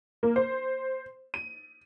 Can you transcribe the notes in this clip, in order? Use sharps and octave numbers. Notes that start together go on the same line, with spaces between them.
A#3
C5
D#7